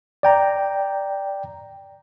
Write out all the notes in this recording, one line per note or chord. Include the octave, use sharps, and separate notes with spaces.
D5 G5 A#5